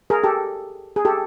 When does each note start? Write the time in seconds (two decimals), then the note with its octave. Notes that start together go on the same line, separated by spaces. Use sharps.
0.10 G#4 A#4
0.23 G4 A4
0.96 G#4
1.05 G4 A4